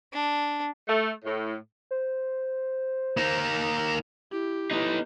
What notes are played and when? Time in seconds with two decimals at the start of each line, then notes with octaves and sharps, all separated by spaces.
0.13 D4
0.88 A3
1.24 A2
1.91 C5
3.17 A#3 D#4
4.32 E4 G4
4.71 B3 D#4 E4